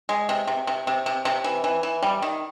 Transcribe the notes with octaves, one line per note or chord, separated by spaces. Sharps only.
G#3
C3
C3
C3
C3
C3
C3
E3
E3
E3
G3
D#3